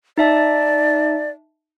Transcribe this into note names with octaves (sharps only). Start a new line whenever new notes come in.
D#4 D5 E5 A5